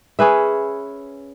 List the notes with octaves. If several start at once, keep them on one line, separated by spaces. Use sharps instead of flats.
C#4 G#4 B4 E5